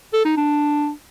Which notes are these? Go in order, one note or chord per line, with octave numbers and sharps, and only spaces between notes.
A4
D#4
D4